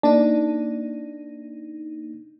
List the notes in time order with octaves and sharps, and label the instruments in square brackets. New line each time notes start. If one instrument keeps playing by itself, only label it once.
[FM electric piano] A#3 D#4 [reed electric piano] D4